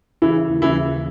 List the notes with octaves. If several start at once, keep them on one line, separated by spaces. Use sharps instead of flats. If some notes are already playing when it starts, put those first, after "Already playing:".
C#3 E3 E4
D#2
E3 E4
E3